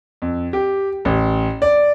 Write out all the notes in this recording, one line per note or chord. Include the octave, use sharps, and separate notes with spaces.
F2
G4
A1
D5